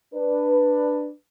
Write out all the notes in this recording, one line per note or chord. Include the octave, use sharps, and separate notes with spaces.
D4 B4